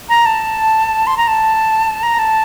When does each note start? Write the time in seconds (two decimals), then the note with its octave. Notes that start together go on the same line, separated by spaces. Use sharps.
0.09 A#5
0.26 A5
1.07 C6
1.17 A#5
1.28 A5
2.03 A#5
2.19 A5